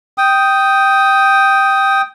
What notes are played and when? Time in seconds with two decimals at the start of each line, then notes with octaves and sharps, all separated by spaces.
0.18 G5 D#6